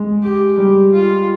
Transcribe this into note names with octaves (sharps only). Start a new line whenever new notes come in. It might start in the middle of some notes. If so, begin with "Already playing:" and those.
Already playing: G#3
G4
G3 G4
F4